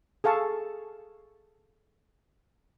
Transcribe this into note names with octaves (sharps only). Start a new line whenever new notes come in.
G#4 A4 F5 A5 C#6